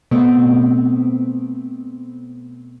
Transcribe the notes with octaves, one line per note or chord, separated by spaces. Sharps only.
B2 A3 B3 C4